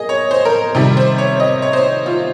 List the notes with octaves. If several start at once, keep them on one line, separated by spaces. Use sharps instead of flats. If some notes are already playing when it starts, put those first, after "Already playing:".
Already playing: A#3 G#4 D#5
C#5
C5
A#4
C3 D#3 G3
C5
C#5
D#5
C#5
C5
F4